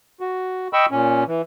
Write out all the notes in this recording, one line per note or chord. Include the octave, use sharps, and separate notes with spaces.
F#4
D#5 G5 B5 C#6 E6
A#2 C#4
E3